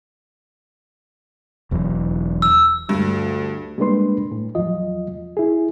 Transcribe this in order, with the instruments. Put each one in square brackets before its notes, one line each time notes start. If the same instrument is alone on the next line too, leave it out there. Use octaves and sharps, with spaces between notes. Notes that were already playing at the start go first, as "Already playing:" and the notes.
[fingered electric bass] E1 E2 F#3
[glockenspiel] E6
[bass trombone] D2 [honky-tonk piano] G2
[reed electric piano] G3 G#3 A#3 D4 B4 C6
A2
E2 F3 F#3 F4 D#5
E4 G#4